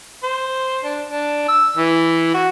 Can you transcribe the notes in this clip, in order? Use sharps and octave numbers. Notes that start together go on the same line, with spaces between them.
C5
D4
D4
E6
E3
F#4